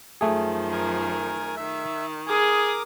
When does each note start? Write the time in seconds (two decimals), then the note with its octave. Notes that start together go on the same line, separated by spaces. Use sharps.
0.21 F#2 D#3 F3 A3 G#4
0.72 A#4 G#5
1.57 D#3 E5
2.28 G#4 A#4 D6 D#6